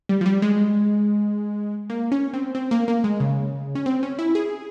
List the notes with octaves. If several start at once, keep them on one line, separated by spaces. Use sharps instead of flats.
G3
F3
G3
G#3
A#3
C#4
C4
C4
A#3
A#3
G#3
C#3
C#4
C4
C#4
E4
G#4